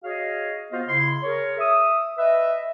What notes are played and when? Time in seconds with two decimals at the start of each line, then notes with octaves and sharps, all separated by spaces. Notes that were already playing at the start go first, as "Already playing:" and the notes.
0.03 F#4 G#4 C#5 D#5 F5
0.71 B3 F4 F#4 C5 D#5 F5
0.87 C#3 E4 C6
1.23 G#4 A#4 C#5
1.59 E5 D#6
2.17 B4 D#5 E5